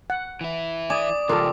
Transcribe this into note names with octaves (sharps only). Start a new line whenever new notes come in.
F#5
E3 E4
D5 G#5 D6 D#6
C#2 F3 F4 G4 A4 A#4